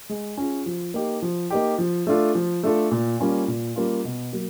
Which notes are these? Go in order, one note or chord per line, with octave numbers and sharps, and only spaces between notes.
G#3
C#4 F4 G#4
F3
A#3 D#4 G4
F3
A#3 D#4 G4
F3
A3 D4 F4 A4
F3
A3 D4 F4 A4
A#2
G3 A#3 C#4 F4
A#2
G3 A#3 C#4 F4
B2
F#3 A#3